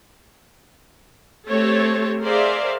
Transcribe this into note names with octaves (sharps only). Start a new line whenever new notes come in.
A3 C4 G4 A4 C#5
G#4 A#4 C5 D5 E5 F5